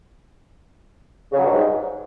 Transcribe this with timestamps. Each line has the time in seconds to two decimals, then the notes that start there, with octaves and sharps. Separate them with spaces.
1.33 C#3
1.38 F#3
1.44 G2
1.50 G#2